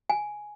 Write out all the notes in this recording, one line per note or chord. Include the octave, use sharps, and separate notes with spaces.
G#5